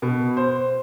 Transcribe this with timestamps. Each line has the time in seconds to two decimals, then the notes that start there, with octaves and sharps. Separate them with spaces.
0.02 B2
0.37 C5